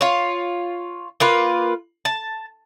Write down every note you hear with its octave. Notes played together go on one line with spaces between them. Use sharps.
F4 C#5
A#3 F4 B4
A5